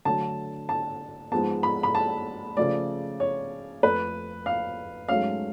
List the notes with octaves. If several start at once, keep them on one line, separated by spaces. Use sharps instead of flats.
D3 F#3 A3 D4 A5
A5
G#2 F3 G#3 B3 A5
B5
B5
A5
C#3 F3 A3 D5
C#5
F2 F3 A3 B4
F5
G#2 F#3 A3 C#4 F5